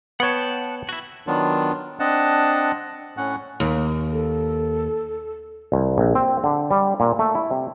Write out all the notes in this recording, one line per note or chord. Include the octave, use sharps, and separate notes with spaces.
B3 C#5 F#5 G5 A5
E4 F#4
D#3 F#3 B3 D4 F4
C4 D4 D#5 F#5 A5
A2 C#4 F#5
D#2
A4
C2
A#1
C4
D3
G3
A#2
A3
E4
C3